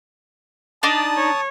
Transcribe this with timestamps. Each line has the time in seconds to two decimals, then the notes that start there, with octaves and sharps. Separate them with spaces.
0.83 D4 D#4 A5 D6 D#6
1.16 C#5